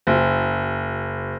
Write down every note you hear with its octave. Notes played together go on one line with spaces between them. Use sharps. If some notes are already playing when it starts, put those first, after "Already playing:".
F#1